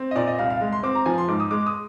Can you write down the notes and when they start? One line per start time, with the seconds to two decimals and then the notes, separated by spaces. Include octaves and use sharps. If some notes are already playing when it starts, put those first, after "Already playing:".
Already playing: C4
0.11 D#5
0.15 A#2 D5
0.27 D#5
0.39 C2 F5
0.50 F5
0.61 G#3
0.72 C6
0.83 C4 D6
0.95 A#5
1.06 F3 G#5
1.18 C6
1.28 G#2 D6
1.40 D#6
1.51 G#3 D6
1.66 D#6